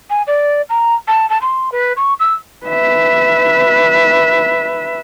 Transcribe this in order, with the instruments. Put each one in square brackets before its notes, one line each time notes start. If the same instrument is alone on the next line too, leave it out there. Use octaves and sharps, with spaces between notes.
[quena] G#5
D5
A#5
A5
A5
C6
B4
C#6
E6
[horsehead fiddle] B4 E5